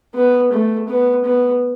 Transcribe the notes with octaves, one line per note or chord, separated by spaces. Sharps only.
B3
A3
B3
B3